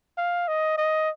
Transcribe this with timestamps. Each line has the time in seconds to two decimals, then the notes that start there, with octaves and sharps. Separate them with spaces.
0.18 F5
0.48 D#5
0.78 D#5